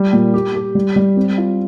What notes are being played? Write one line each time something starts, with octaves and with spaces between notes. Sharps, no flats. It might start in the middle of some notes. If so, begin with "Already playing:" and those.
Already playing: G3
A#2
G4
G4
G3
G3
C4
F4